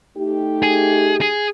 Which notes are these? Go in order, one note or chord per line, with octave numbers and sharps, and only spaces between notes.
A3 D#4 G4
G#4
G#4